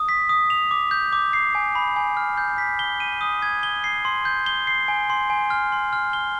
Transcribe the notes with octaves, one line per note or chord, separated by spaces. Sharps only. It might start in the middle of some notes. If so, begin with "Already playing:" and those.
Already playing: D#6
B6
D#6
F7
D6
G6
D6
C7
G#5
B5
G#5
F6
G6
B6
G7
D#7
D#6
G#6
G7
C7
C6
G6
G7
C7
G#5
C6
G#5
F6
C6
F6
G7